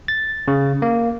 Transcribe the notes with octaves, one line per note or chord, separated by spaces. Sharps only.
A6
C#3
A#3